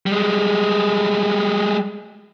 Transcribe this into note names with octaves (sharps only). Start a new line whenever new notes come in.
G3 G#3